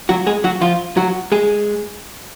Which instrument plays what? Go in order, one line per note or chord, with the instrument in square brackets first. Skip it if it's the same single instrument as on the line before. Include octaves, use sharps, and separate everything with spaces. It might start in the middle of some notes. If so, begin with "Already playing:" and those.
[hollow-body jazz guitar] F#3 F#4
G#3 G#4
F#3 F#4
F3 F4
F#3 F#4
G#3 G#4